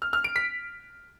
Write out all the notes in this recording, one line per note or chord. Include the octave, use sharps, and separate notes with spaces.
F6
F6
D7
B6